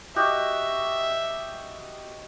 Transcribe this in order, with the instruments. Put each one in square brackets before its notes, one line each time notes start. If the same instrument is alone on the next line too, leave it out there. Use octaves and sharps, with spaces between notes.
[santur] F#4 G4 D#5 [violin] E5